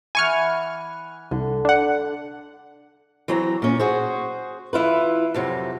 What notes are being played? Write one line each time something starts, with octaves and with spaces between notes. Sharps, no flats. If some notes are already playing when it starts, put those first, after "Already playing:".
E3 F#5 G#5 C#6 F6
C2 D3
D4 F#5
E3 F#3 C4 A#5
A#2 C#4
F#4 G#4 C5
E3 E4 F4 B4
F2 C3 F#3